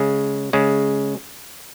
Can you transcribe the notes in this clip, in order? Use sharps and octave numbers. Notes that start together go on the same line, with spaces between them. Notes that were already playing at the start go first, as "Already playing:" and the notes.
Already playing: C#3 G#3
C#3 G#3